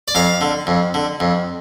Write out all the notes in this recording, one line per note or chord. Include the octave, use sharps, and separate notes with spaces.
D5
F2 F5
D3
F2
D3
F2